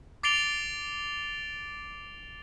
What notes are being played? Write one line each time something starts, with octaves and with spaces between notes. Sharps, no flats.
D6 A6 C7 D7 F7 G7